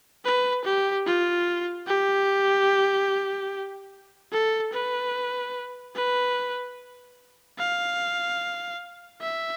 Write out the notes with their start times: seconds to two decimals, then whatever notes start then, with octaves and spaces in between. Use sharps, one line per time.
0.24 B4
0.65 G4
1.06 F4
1.87 G4
4.32 A4
4.73 B4
5.95 B4
7.59 F5
9.21 E5